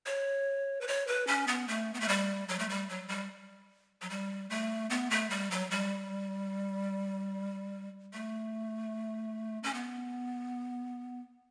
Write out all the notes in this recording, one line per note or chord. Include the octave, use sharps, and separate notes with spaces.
C#5
B4
C#5
B4
C#4
B3
A3
B3
A3
G3
F#3
A3
G3
F#3
G3
F#3
G3
A3
B3
A3
G3
F#3
G3
A3
C#4
B3